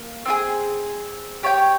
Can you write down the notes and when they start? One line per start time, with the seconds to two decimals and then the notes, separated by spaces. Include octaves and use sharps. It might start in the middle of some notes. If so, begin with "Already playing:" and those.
Already playing: A#3
0.26 C4 F4 G#4
1.43 G4 C#5 G5